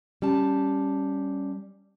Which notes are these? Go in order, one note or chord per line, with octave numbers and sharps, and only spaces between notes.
G3 C#4 A5